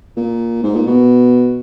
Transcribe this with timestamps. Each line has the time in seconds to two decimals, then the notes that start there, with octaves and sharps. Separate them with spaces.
0.17 A#2
0.63 G#2
0.75 A#2
0.87 B2